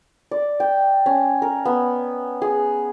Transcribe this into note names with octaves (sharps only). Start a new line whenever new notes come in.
D5
G5
C#4
A#4
B3
G#4